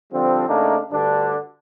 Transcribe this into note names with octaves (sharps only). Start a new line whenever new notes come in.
D3 F3 G3 C4
C#3 A3 A#3 D4 D#4
D2 G2 D3 D4